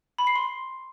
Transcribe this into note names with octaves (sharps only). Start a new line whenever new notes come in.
B5
C7
C6